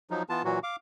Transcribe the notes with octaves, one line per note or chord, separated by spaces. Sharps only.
F3 F#3 D#4
E3 B3 F4 A5
A#2 E3 F#3 F#4
F5 D6